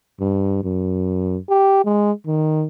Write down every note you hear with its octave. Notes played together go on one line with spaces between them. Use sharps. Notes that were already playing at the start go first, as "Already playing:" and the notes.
G2
F#2
G4
G#3
D#3